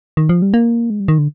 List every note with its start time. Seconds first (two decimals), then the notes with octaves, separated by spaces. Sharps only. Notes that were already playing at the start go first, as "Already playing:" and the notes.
0.17 D#3
0.29 F3
0.42 G3
0.54 A#3
0.90 G#3
1.00 G3
1.08 D#3
1.18 D3